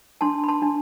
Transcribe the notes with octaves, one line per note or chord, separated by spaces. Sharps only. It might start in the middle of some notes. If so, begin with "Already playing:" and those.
D4 A5 C6
B5
A5 C6
D4